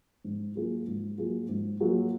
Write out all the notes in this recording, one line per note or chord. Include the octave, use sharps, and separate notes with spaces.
G#2
F#3 A#3 F4 G#4
G#2
F#3 A#3 F4 G#4
G#2
F#3 A#3 F4 G#4